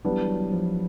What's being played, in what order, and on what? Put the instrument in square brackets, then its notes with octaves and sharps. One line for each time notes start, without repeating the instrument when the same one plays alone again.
[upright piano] E3 G3 B3 D4 [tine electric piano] F#3
[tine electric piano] F#3
F3